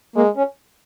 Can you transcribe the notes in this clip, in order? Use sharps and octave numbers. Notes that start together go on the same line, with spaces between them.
G#3 A#3
C#4